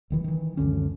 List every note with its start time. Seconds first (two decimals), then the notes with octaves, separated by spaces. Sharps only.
0.10 D#1 D#3 E3
0.24 D#3 E3
0.57 C#2 F#2 D3 C#4